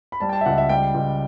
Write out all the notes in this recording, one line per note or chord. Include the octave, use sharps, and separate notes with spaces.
B5
G3 A5
G5
A5
E5
C#2 F#5
E5
G3 G5
C#2